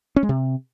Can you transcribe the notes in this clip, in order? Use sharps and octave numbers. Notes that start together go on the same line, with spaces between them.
C#4
G#3
C3